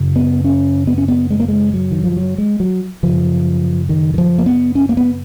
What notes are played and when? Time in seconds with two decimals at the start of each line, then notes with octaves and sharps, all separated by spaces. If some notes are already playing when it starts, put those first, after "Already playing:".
Already playing: F#2 C#3
0.16 B3
0.44 C#4
0.87 B3
0.98 C#4
1.08 B3
1.30 G#3
1.40 A#3
1.48 G#3
1.74 F#3
1.91 D#3
2.04 F3
2.17 F#3
2.38 G#3
2.60 F#3
3.03 F#2 C#3 F3
3.89 D#3
4.14 D#3
4.18 F3
4.38 A#3
4.46 B3
4.75 C#4
4.89 A#3
4.97 B3